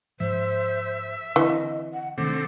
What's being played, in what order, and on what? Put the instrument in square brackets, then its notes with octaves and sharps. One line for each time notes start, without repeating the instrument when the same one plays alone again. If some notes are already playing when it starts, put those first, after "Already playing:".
[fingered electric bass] G#2 F3 [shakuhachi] C5 [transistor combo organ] E5
[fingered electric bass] D3 C4 [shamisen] E3 [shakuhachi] D#5
[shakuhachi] F#5
[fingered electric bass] C3 D#3 D4 [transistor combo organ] A3 C4 [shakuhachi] D6